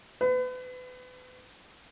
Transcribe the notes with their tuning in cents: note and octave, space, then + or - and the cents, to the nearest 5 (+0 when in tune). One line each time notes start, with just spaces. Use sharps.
B4 +35